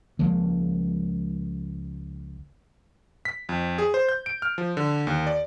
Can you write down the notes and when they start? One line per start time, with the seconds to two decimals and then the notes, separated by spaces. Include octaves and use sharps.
0.19 C#2 F3 G#3 A#3
3.25 B6
3.49 F2
3.78 G#4
3.94 C5
4.09 G6
4.26 D7
4.42 F6
4.58 F3
4.77 D3
5.07 D#2
5.27 D5